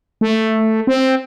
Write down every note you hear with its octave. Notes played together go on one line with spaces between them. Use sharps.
A3
C4